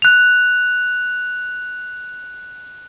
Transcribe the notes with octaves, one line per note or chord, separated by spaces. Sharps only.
F#6 F7